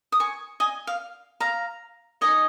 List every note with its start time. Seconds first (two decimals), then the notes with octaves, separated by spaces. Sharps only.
0.12 D#6
0.20 G#5 C#6
0.60 D#5 G#5
0.87 F5
1.40 F5 A#5
2.21 D#4 A#4 C#5 D#5 G#5